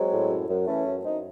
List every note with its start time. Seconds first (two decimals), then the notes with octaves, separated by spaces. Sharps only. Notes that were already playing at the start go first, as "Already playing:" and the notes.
Already playing: F#3 G#3 C4
0.12 A2
0.30 F#2
0.49 F#2
0.67 E3 A3 C#4
0.86 F#2
1.04 F#2 C4 D#4